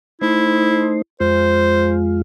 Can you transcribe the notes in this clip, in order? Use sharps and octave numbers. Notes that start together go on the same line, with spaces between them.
A3 D#4 E4 C5
F2 G#3 F4 C5